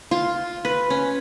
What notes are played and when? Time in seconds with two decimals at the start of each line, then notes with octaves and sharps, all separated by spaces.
0.11 F4
0.65 B4
0.90 C#4